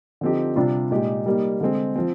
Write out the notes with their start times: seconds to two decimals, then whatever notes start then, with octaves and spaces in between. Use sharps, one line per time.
0.21 D3 F3 C4 D#4 G4
0.56 C3 G3 D4 F4
0.91 A#2 G#3 D#4 G4
1.26 G3 A#3 D#4 G4
1.61 D3 G#3 C4
1.96 F3 C4